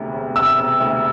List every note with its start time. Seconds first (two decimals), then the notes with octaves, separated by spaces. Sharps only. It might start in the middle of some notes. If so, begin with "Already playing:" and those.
Already playing: E1 D2 C3
0.13 E1
0.35 C3 E6
0.59 E1
0.80 D2